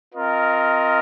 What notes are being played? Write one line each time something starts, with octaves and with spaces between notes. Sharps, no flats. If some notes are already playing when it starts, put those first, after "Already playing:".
C4 F4 A#4 D#5